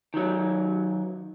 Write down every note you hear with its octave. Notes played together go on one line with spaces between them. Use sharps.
D#3 F#3